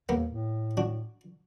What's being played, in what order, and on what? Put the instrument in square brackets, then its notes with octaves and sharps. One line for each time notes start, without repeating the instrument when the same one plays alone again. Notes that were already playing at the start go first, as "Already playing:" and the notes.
[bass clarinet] D#2 [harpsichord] A#3 B3
[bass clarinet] A2
[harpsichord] D4 F#4